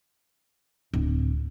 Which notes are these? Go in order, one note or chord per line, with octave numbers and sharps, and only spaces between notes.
D1